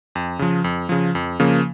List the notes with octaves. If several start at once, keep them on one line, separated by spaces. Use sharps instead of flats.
F2
C#3 F3
F2
C#3 F3
F2
C#3 F3 A#3